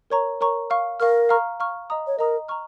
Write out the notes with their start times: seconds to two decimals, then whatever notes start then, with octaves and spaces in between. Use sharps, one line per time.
0.10 A#4 C#5 A#5 C#6
0.41 A#4 C#5 A#5 C#6
0.70 F5 C#6 F6
1.00 A#4 F5 C#6 F6
1.29 F5 A#5 C#6 F6
1.60 F5 A#5 C#6 F6
1.90 D#5 A#5 D#6
2.07 C#5
2.19 A#4 D#5 A#5 D#6
2.48 A#5 C#6 F6